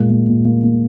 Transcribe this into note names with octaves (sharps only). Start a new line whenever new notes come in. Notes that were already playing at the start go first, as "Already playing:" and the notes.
Already playing: A#2 G#3 A#3
A#3
A#2
A#3
A#3